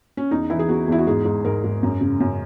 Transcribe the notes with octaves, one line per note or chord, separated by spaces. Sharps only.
C#4
E2 D#4
E3 E4
G#4
E2 F#4
E2 E4
F#4
G#2 G#4
G#2
G#2 A#4
G#2
F#2
C#3
F#2